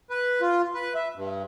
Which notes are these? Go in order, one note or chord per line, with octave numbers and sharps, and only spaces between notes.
B4
F4
B4
E5
G2